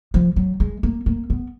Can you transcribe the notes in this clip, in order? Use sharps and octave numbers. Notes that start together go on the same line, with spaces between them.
F3
F#3
G#3
A#3
A#3
B3